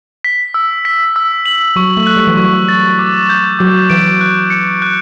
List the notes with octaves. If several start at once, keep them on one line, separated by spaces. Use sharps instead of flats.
B6
E6
B6
E6
F#7
F#3 C#6
A3
F#6
G3
E3
F#3 C#6
A6
D6
G6
F#3 D6
E3 D7
F#6
C#7
F#6